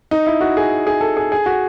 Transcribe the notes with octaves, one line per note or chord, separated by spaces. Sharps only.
D#4
E4
F#4
G#4
G#4
A4
G#4
G#4
F#4